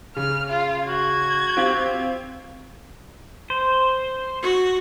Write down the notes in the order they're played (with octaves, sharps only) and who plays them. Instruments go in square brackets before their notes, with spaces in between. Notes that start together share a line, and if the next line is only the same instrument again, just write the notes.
[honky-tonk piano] C#3 [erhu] F6
[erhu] F4
[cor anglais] F#4 [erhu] G#6
[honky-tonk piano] C4 F4 G4
[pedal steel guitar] C5
[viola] F#4